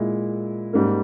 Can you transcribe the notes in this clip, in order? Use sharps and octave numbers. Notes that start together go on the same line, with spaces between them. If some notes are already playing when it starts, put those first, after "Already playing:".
Already playing: A#2 G#3 E4
G#2 G3 A#3